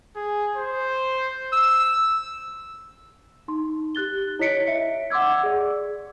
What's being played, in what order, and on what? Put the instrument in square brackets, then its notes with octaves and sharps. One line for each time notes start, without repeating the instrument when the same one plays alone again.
[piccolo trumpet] G#4
C5
E6
[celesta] D#4 C6
G4 F#6 A6 G7
E4 C#5 D#5 B6 C#7 D7
E5
F#5 C6 D6 E6 G#6
G#4 D5